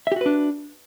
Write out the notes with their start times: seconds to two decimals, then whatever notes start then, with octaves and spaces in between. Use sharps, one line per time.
0.07 E5
0.12 G4
0.16 F#4
0.21 B4
0.26 D4